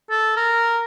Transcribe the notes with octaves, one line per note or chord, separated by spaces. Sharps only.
A4
A#4